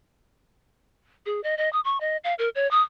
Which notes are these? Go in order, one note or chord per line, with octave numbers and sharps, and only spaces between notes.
G#4
D#5
D#5
D#6
C#6
D#5
F5
A#4
C#5
D#6